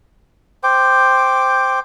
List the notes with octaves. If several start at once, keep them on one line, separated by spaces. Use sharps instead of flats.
C5 G5 D6